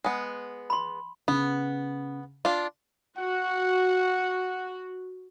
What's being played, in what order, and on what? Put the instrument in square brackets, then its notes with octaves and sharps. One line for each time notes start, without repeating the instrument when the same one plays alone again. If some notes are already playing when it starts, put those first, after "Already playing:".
[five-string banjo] G#3 B3
[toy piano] B5 C6
[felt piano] C#3 [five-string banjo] B3
[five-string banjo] D4 F4
[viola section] F#4 [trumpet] F#5